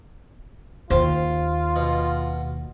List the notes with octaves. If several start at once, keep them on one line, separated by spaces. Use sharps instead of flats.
D#2 F4 C5 F5 G5
B2